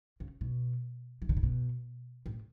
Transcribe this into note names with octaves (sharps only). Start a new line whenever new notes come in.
C#3
B2
E3
D3
C#3
B2
A2